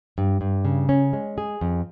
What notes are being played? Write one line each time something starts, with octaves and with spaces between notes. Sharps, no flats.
G2
G2
C#3
C#4
G#3
G#4
F2